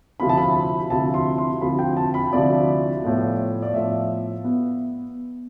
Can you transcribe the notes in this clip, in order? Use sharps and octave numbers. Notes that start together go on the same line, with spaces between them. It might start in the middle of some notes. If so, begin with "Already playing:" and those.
D2 C3 F3 C4 E4 B5
A5
B5
D2 C3 F3 C4 E4 A5
C6
C6
D2 C3 F3 C4 E4 B5
G5
A5
B5
D2 C3 F3 C4 E4 D5
A2 F3 B3
D5
A2 F3 B3 E5
B3